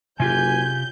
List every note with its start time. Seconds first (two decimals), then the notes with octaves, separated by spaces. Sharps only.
0.20 F#1 C3 F4 G4 G#5 G6